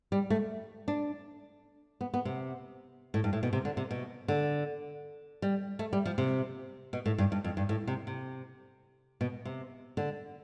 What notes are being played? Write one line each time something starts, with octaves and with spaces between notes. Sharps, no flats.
G3
A3
D4
B3
B3
C3
A2
G2
A2
B2
C3
D3
C3
B2
D3
G3
A3
G3
F3
C3
B2
A2
G2
G2
F2
G2
A2
C3
C3
B2
C3
D3